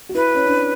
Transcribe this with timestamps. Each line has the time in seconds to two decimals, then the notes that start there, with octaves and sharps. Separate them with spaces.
0.09 F#4
0.15 E4 B4
0.34 C#4
0.46 D4